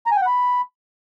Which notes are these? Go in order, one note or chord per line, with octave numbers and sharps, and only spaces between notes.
A#5
G#5
G5
F#5
B5